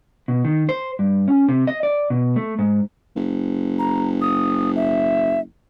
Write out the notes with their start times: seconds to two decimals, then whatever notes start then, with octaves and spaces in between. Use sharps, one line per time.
0.28 B2
0.45 D#3
0.69 C5
0.99 G2
1.28 C#4
1.49 C3
1.67 D#5
1.83 D5
2.10 B2
2.36 A3
2.59 G#2
3.16 F#1
3.79 A#5
4.21 D#6
4.76 E5